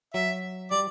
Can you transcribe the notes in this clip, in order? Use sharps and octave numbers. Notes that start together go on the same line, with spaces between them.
F#3 E5
G3 D5